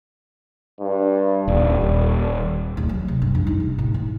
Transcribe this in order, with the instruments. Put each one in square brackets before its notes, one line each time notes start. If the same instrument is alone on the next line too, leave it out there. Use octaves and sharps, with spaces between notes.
[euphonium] G2
[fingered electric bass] D#1 [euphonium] G3
[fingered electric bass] D#1
[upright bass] D1
F#3
C3
G2
F2
D#4
C3
A1
G#2